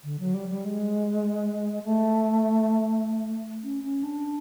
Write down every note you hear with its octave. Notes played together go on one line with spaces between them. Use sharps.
D3
F#3
G3
G3
G#3
A3
C#4
C#4
D4